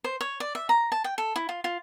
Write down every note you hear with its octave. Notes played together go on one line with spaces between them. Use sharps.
C5
C#5
D5
E5
A#5
A5
G5
A4
E4
F4
F4